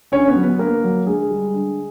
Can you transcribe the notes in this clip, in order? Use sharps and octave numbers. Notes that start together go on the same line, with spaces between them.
D3 C#4 C#5
B3 B4
F#3
B3 B4
D3 A#3 A#4
F#3
D3 G#3 G#4
G3
D3